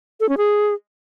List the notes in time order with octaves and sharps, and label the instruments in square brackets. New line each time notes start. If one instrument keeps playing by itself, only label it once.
[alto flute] A4
C#4
G#4